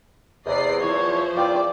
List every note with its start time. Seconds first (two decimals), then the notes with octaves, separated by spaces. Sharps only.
0.46 E2 C3 D5 D#5 C7
0.81 E2 E3 F3 C5 C#5
1.37 E2 F4 D5 G5